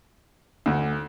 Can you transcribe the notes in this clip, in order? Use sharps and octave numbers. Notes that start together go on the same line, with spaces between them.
D2